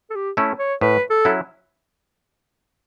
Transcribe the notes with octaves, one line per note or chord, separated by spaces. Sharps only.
A4
G4
A3 C#4 E4
C#5
A2 B4
A4
F#3 C#4 E4